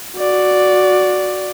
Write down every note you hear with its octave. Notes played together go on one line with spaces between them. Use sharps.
F#4 D5